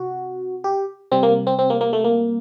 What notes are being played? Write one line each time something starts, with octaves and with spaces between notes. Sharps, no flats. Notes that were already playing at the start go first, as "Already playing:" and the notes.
Already playing: C3 F#4
G4
C3 G3 C4
A#3
C4
C4
A#3
A#3
A3
A#3